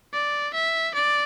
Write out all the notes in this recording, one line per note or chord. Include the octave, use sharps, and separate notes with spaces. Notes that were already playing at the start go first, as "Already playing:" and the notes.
D5
E5
D5